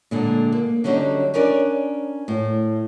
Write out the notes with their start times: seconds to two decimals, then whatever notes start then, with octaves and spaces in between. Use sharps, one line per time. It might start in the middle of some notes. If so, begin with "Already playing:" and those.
0.11 A#2 D3 G#3
0.52 A#3
0.84 D3 F#3 G3 C#4 D#4
1.34 C#4 D4 A#4 D5
2.28 A2